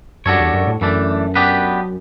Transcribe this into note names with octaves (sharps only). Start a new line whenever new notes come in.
F#2 G3 D4 F#4 A4 C#5
E2
F#2
A2
F#2 E3 A3 D4
B3 D4 G4 B4